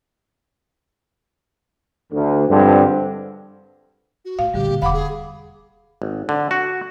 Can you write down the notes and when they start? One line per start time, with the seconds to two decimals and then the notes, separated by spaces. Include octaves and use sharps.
2.12 D2
2.49 G2 D3 F3 G#3 C4
4.25 F#4
4.39 A2 F5
4.54 A#1 A2 D3 G3 G4
4.68 A#2
4.82 E1 B2 F5 F#5 B5 D6
4.93 B3 G#4
6.02 G#1
6.29 D3
6.51 F#4